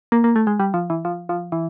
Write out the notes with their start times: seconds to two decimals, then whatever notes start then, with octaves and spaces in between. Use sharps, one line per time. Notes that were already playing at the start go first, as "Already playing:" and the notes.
0.12 A#3
0.24 A#3
0.36 A3
0.47 G#3
0.60 G3
0.74 F3
0.90 E3
1.05 F3
1.29 F3
1.52 E3